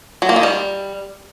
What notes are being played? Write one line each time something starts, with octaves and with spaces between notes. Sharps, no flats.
F#3
A#3
D#3
G3